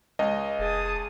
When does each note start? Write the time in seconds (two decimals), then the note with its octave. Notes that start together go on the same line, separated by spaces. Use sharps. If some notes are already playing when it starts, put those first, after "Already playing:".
0.19 C#2 D#5
0.59 F1 G#4 A5 D#6